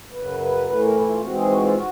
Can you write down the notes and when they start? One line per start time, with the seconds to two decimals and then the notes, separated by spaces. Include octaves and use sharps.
0.12 F#2 C#3 F#3 B4
0.40 B4
0.67 A2 E3 A3 B4
0.81 A#4
0.94 E4
1.07 F4
1.21 G#2 E3 G#3 C4 F#4
1.35 G#4
1.49 F#4
1.62 F4
1.76 F#4